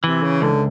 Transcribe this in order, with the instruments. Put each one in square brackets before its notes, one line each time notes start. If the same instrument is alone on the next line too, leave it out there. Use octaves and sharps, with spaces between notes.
[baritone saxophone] C3 [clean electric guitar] E3
[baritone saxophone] C#3
[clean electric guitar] C#2 [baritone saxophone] D3